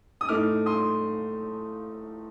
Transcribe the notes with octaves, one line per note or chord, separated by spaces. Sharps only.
D#6
A2 A3 D#4 D6 F6
C6 D#6